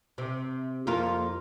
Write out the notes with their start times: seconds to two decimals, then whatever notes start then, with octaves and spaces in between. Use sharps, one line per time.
0.18 C3
0.87 F2 A#3 F4